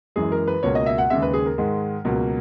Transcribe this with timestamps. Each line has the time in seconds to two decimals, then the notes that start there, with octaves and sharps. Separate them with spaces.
0.16 F#2 E3 G#3 G#4
0.32 A#4
0.48 B4
0.63 C#2 B2 A#3 C#5
0.75 D#5
0.86 E5
0.98 F#5
1.10 D#2 C#3 G#3 E5
1.22 B4
1.34 G#4
1.46 A#4
1.58 G#2 D#3 G#3
2.05 C#2 B2 F#3 A#3